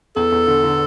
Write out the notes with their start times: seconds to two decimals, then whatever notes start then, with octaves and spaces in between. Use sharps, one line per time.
0.16 E2 A4
0.32 E2
0.47 D3
0.64 D3